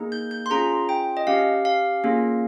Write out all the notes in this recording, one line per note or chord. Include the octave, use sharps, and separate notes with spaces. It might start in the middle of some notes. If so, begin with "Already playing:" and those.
Already playing: A#3 D#4 G#4
G6
G6
C6
C#4 F4 G#4 A#5
G5
D#5
C#4 G4 F5
F5
A#3 C#4 F4 G#4